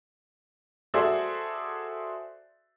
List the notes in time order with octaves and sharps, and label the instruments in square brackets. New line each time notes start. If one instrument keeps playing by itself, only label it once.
[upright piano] F#4 G#4 A4 C5 D5 E5